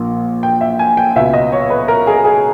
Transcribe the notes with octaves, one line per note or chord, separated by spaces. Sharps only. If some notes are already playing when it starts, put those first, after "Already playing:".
Already playing: A#1 A#2
G5
E5
G#5
G5
C#2 B2 E5
D#5
C#5
B4
A#4
G#4
G#4